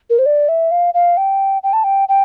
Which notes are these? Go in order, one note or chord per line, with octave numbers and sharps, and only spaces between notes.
A#4
C5
D5
E5
F5
F5
G5
G5
A5
G5
G5